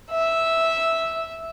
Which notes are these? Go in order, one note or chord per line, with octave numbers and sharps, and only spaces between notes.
E5